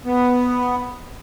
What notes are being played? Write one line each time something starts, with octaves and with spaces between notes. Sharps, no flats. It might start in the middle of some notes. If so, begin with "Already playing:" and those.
B3